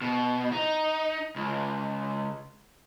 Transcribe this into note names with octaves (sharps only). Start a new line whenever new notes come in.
B2
D#4
C#2